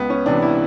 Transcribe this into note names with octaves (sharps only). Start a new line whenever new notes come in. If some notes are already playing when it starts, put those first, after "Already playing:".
Already playing: C#2 B3
C#4
C3 E3 D4
E4